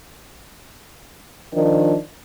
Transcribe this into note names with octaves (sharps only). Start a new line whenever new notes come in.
D#3 F3 D4